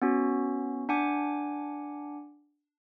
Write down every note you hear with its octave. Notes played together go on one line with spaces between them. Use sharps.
B3 C#4 F#4
D4 F#5 G#5 D6